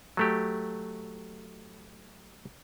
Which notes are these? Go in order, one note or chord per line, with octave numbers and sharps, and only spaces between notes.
F#3 A3 G4